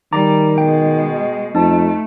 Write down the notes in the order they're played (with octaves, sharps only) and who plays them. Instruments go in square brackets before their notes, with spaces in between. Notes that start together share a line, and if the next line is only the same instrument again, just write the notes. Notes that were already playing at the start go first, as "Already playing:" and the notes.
[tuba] D#3 [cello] G3 [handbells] A#5 D6 A6
[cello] B2 G#3 [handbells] G5
[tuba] F2 [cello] A3 [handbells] D#4 A5